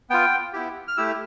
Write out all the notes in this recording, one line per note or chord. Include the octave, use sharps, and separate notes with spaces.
B3 F4 G5
B3 E4 G4
F6
A3 E4 G4 E6